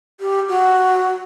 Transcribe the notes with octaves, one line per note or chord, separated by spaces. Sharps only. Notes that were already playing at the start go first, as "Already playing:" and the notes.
G4
F#4